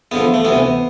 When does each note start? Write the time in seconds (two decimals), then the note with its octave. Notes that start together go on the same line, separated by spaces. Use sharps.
0.11 E2 D3 F3 B3
0.34 A3
0.45 D2 C3 E3 B3